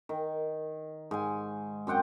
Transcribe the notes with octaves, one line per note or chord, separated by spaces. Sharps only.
D#3
G#2 G#5
F#2 C4 F#5 G5